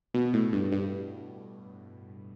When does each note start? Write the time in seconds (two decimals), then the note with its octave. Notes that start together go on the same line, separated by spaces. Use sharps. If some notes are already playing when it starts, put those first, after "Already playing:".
0.14 B2
0.33 A2
0.53 G2
0.72 G2